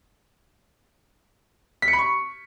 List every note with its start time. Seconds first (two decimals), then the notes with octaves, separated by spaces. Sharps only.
1.82 B6
1.88 C#7
1.93 B5
1.99 C#6